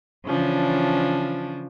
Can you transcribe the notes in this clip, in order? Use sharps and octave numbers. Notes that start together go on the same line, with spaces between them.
C#3 E3 F3 C#4 D4